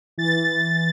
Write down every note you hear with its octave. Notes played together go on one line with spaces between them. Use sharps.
E3 A6